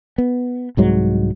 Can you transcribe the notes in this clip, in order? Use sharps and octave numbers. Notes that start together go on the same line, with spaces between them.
B3
C2 G#2 F#3 G#3